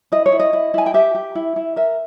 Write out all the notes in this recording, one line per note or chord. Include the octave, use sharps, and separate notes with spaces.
E4 D#5
C#5
E4
D#5
E4
E4 G#5
G5
G4 E5
G4
E4
E4
A#4 E5